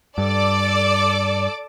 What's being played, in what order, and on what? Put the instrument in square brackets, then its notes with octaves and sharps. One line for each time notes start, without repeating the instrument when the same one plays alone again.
[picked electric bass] G2 [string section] A4 D5 D6